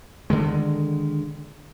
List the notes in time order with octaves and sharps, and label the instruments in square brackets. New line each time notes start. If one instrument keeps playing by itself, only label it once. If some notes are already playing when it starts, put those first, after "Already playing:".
[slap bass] D3 D#3 G#3